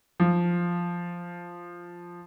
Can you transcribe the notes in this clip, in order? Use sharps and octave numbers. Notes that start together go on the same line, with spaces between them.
F3